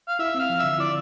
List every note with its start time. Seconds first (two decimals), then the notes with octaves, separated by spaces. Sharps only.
0.08 F5
0.19 E4 E5
0.35 C4 F5
0.50 F3
0.59 D3 E5
0.79 E4 D5